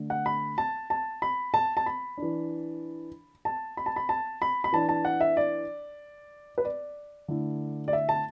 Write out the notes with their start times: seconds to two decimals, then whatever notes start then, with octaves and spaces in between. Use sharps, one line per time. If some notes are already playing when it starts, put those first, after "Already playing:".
Already playing: D3 A3 D4
0.10 F#5
0.26 B5
0.58 A5
0.90 A5
1.22 B5
1.54 A5
1.77 A5
1.86 B5
2.18 E3 D4
3.45 A5
3.77 B5
3.86 A5
3.96 B5
4.09 A5
4.42 B5
4.64 B5
4.73 E3 D4 A5
4.89 A5
5.05 F#5
5.21 E5
5.37 D5
6.58 B4
6.65 D5
7.28 D3 A3 E4
7.88 D5
7.93 E5
8.09 A5